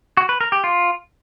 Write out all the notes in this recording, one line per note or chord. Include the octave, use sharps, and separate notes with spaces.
F#4
B4
A#4
G4
F4